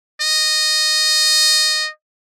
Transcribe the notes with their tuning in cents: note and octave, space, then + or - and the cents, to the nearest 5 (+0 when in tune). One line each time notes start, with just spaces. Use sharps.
D#5 -10